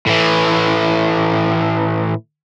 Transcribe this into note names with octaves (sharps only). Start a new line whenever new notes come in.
A2 E3